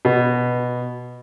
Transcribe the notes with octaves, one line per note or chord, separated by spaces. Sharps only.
B2